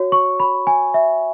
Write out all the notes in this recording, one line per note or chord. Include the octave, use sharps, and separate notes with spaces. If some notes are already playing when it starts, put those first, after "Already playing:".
Already playing: F#4 C#5
C#6
B5
G#5
E5